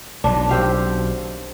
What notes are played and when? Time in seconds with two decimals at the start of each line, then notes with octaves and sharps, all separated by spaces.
0.24 B1 D#3 F#3 D4
0.49 C4 G4 F5